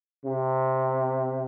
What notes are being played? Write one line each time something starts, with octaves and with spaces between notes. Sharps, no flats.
C3